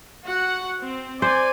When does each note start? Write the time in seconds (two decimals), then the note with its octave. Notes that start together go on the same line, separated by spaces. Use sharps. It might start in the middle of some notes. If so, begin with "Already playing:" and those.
0.24 F#4 F#5
0.81 C4
1.22 C5 D5 G#5